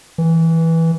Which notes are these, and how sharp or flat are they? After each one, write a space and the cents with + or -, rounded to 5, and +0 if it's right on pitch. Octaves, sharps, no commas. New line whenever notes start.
E3 -10